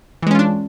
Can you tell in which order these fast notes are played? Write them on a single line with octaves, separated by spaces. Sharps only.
E3 G#3 C#4 F4 D4